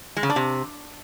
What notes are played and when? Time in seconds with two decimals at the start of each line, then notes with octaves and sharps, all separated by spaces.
0.17 G#3
0.23 C#3
0.30 D4
0.36 C3